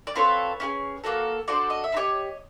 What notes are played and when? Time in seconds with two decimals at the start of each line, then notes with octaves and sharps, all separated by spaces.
0.07 D5
0.15 C4 F4 A4 B4 C#5
0.60 C#4 E4 G#4
1.04 A#3 D4 F#4 A4
1.48 D4 F#4 A4 C5 D5
1.70 D#5
1.84 E5
1.92 C4 D#4 G4 C#5 D#5